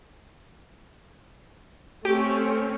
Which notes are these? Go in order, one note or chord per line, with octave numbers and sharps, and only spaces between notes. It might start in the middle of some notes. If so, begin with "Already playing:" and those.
A3 C4 C#4 G4